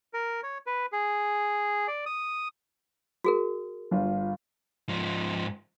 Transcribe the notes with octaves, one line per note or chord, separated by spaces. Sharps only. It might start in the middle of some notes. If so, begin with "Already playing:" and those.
A#4
C#5
B4
G#4
D5
D#6
F#4 G#4 A#4
G1 F4
G#2 F3